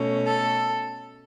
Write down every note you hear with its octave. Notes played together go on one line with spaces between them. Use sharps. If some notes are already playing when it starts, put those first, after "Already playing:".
Already playing: B2 A3 C#4
A4